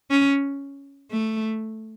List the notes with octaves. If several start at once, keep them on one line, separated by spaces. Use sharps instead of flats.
C#4
A3